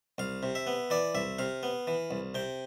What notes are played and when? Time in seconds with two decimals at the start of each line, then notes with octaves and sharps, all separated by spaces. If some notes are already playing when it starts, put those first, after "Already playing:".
0.18 C2 F5
0.43 C3
0.55 E5
0.67 B3
0.90 E3 D5
1.15 C2 E5
1.39 C3 F5
1.63 B3
1.87 E3
2.11 C2
2.35 C3 G5